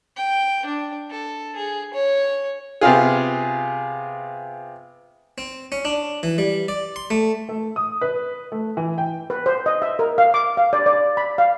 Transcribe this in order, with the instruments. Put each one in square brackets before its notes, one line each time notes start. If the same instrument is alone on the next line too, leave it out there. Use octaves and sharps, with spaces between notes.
[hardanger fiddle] G5
D4
A4
G#4
C#5
[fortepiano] C3 B3 F4 G#4
[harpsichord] C4
C#4
D4
E3
G3
D5
C6
A3
[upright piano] A3
D#6
B4
A3
E3
G5
[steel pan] B4
C5
D#5
E5
A#4
F5
D6
F5
D5
D5
B5
F5